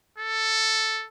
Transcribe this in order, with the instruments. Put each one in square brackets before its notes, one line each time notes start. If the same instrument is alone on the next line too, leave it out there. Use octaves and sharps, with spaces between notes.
[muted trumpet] A4